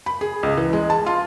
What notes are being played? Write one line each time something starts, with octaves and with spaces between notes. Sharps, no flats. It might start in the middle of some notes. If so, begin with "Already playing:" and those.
B5
G#4
C#2
E3
G#3
A5
F4